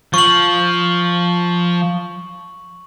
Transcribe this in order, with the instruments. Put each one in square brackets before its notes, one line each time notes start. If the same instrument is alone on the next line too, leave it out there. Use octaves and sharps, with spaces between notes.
[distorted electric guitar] F3 [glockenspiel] C#6 F#7